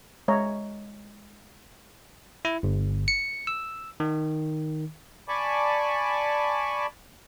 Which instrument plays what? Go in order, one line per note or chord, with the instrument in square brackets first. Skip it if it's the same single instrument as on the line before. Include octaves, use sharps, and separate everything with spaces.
[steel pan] G#3 C#5 E5 A#5
[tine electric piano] E4
G1
C#7
E6
D#3
[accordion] D5 G#5 A5 B5 C#6 D6